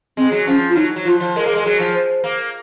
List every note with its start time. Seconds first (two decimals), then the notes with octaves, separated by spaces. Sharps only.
0.17 G#3 C4
0.32 F#3
0.47 F3 C#4
0.69 F4
0.76 F#3 D#4
0.96 F#3
1.05 F3 F4
1.20 F3
1.36 G#3 A#4
1.46 A#3
1.55 G#3
1.66 F#3
1.79 F3
1.95 C5
2.24 A#3